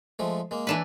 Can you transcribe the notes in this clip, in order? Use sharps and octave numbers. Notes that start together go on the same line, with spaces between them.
F3 G#3 A3
G#3 A#3
E3 D4 B4